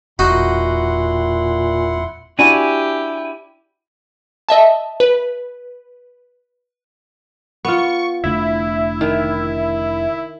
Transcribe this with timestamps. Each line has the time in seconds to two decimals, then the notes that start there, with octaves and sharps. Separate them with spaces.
0.19 E1 A#2 D#4 E4 F#4 F#5 C6
2.39 D4 E4 F#4 G4 G#5
4.49 D#5 E5 A5
5.00 B4
7.65 B3 F4 C#6
8.24 F1 D3 A3 E4
9.01 D#3